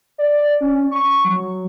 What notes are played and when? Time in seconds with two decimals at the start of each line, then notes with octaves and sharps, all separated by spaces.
0.18 D5
0.61 C#4
0.91 C#6
1.25 F#3